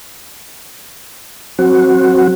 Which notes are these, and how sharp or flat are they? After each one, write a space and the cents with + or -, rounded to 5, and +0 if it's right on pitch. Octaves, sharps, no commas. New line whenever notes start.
F#3 +0 C4 +30 F#4 +0